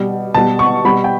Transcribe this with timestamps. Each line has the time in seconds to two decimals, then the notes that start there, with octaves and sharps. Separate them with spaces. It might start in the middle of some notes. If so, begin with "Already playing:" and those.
Already playing: B2 G3
0.34 B2 G3 A5
0.59 C#6
0.85 B2 G3 B5
1.04 G5